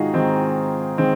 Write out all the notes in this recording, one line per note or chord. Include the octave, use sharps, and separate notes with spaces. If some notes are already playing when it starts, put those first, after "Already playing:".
Already playing: G#2 D#3 G#3 D#4 F4 F#4 G#4
G#2 D#3 G#3 C4
D#3 G#3 C4